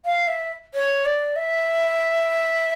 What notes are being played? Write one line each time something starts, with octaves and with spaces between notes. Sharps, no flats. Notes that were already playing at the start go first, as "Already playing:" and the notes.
F5
E5
C#5
D5
E5